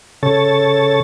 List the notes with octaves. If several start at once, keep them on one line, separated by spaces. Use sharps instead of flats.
C#3 A4 C#5 A6